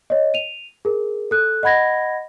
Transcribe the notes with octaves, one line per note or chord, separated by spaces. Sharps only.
C#5 D#5
D#7 F7
G#4 A#4
A4 F#6
D#5 F#5 B5 G#6 A#6